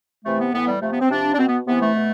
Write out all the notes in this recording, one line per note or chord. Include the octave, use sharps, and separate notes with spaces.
C3 E3 A3
B3
A2 E3 B3
G3
C3 F3 A3
B3
C4
C3 F3 D4
D4
B2 C4
B3
C3 E3 B3
A3
B2